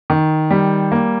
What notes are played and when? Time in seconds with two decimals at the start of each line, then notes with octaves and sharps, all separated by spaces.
0.10 D#3
0.51 G3
0.92 A#3